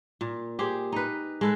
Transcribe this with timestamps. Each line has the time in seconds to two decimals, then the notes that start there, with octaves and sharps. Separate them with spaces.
0.21 A#2
0.59 G4 G#4 C5
0.92 D#4 B4
1.41 G#3 A4 B4